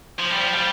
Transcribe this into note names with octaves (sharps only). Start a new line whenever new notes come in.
F3
G3
F3
G3